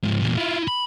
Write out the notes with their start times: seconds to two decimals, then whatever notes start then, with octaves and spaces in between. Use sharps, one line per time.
0.03 G#2 F3
0.22 E2 A#2
0.37 E4 F4
0.68 B5